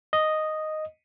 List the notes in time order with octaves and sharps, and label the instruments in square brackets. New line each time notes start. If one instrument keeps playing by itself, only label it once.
[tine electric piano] D#5